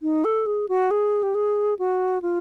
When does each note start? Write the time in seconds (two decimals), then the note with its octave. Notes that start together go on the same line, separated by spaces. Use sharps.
0.02 D#4
0.24 A4
0.46 G#4
0.69 F#4
0.91 G#4
1.23 G4
1.35 G#4
1.79 F#4
2.22 F4